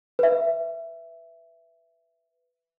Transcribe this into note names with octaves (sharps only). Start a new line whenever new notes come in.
B4 E5